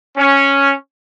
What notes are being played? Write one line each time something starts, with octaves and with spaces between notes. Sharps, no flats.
C#4